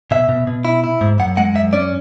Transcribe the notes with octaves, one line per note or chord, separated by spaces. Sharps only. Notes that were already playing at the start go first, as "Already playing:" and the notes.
B2 E5
B2
B2
E4
E4
G#2
F#2 F#5
G#3 F#5
F#2 E5
C#4 D5